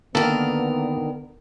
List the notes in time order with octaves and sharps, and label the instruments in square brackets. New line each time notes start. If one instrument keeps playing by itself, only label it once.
[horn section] D3 B3 [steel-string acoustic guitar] D#3 A#4 [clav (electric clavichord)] A#3 A4